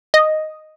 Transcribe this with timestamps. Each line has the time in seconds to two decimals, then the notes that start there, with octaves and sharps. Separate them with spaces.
0.14 D#5